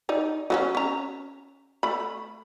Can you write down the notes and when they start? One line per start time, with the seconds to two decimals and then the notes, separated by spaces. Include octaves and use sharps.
0.09 D#4 D5
0.50 F#3 A#3 C#4
0.75 C#4 A#5
1.83 A3 B5